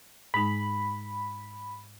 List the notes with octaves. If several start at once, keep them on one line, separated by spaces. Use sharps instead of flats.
G#2 G#3 D#4 B5